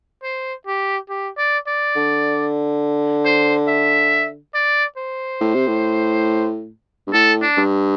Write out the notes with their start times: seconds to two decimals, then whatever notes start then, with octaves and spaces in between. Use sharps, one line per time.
0.23 C5
0.67 G4
1.09 G4
1.38 D5
1.68 D5
1.96 D3
3.25 C5
3.68 E5
4.54 D5
4.98 C5
5.41 A2
5.55 C3
5.67 A2
7.07 G2
7.13 A2 A4
7.42 D4
7.57 G2